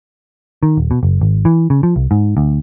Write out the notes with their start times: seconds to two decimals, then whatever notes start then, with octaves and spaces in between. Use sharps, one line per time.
0.63 D#3
0.77 D#1
0.91 B2
1.03 F#1
1.22 G#1
1.45 E3
1.70 C#3
1.83 F3
1.96 C2
2.11 G#2
2.37 D2